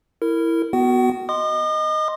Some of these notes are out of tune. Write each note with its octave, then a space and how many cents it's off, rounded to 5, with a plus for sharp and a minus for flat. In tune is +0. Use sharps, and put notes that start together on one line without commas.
E4 +5 A#4 -20
B3 +0 F#4 +0 F#5 +45
D#5 +0 C6 +0 D#6 -45